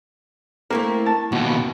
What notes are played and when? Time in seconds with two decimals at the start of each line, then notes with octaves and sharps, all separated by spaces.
0.70 A3 A#3 C4 E4
1.06 A5
1.32 D#2 B2 F#4